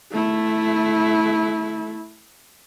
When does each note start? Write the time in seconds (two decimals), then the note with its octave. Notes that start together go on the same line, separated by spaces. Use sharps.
0.12 A3 E4